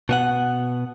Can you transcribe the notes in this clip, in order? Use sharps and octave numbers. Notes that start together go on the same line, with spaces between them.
B2 B3 F#5